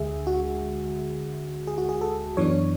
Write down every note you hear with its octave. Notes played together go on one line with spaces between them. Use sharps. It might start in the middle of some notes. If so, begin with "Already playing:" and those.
Already playing: D2 D3 G#3 G#4 E5
F#4
G#4
F#4
G#4
A4
F#2 E3 B3 D4 C#5